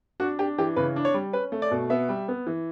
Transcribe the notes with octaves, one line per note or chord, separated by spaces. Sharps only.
D4 F#4
D4 G4
E3 G4
C#3 B4
D4
C#5
G3
C#4 B4
A3
D5
B2
B3 E5
G3
B3
E3